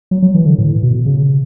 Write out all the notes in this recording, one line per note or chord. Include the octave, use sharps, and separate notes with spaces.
F#3
F#3
E3
D3
A2
B2
C#3